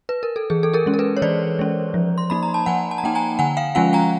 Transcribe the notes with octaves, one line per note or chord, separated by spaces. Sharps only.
B4
A#4
A4
E3 G#4
A4
G#4 A#4
G#3 C#4
A#4
A4 B4
C#5
E3 C5 D5
G#3 C#4
F3
C6
A#3 D#4 B5
A#5
A5
F3 F#5 G#5
A5
A#5
A#3 D#4 G5 A5
G#5 A#5
D3 F#5 G#5
F5 G5
F3 G#3 C#4 F4 F#5 G#5
G#5 A#5